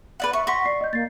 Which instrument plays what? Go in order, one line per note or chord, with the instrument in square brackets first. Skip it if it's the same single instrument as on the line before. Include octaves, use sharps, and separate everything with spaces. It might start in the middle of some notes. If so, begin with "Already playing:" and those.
[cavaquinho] B4 D5 F#5
[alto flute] E5 [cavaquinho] C#6
[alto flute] F#5 [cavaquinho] C6 C#6 [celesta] A#6 B6
[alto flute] D5 [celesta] C7
[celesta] D#5 G6
[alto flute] A#3 [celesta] A6 C7